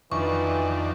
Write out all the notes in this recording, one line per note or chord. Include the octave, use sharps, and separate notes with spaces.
F2 D#3 E3 D4 C#6